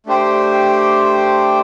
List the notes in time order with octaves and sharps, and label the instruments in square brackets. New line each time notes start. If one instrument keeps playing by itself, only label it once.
[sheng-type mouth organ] A3 D4 G4 C5 G5